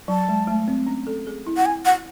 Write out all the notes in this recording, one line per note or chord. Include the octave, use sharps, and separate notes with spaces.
F#3 A5
G#3
A3
C4
C#4
A4
G#4
E4
F#5
G#5
F#5